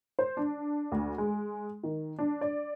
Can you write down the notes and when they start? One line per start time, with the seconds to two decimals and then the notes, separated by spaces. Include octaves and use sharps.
0.19 C5
0.37 D4
0.92 D2
1.18 G#3
1.83 D#3
2.19 D4
2.41 D5